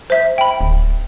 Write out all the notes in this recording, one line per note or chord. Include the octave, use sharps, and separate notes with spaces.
C5 E5
G5 B5
D1